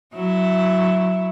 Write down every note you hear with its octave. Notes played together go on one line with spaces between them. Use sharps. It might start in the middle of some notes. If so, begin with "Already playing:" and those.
F#3 E4